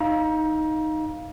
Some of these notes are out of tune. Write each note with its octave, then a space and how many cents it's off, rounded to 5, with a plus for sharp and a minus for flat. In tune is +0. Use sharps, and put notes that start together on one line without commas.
D#4 +0 F5 -5 A#5 +30